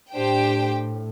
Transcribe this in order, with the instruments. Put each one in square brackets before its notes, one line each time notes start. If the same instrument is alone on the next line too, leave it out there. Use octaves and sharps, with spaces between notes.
[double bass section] A2 [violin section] D4 G4 C5 G5